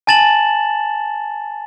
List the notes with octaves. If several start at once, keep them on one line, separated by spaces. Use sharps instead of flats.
G#5 A5 A6 E7 F#7